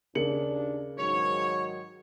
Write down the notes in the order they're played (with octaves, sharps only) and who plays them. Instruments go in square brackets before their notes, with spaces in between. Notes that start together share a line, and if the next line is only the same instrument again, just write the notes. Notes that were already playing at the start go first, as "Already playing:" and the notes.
[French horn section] D#2 D4 [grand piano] C#3 C#7 F#7 [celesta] A#4
[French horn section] G#2 D#3 F#3 [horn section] C#5